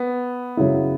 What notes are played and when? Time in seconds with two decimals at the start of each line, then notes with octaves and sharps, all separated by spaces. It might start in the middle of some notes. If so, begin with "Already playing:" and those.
Already playing: B3
0.57 F#2 C#3 F#3 E4